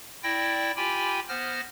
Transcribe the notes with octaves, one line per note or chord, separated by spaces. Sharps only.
E4 D5 G5 A#6
F4 G4 G5 G#5 B5
B3 C5 F6 A#6